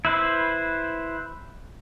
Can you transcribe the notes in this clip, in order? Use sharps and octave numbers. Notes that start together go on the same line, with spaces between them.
E4 B4 C5